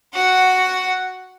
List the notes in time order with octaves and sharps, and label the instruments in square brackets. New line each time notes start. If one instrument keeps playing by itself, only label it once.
[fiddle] F#4 F#5